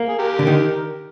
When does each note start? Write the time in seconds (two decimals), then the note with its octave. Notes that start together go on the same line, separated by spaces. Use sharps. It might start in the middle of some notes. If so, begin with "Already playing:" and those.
Already playing: A#3
0.08 G#4
0.18 G4 A#4
0.39 D3
0.47 D#3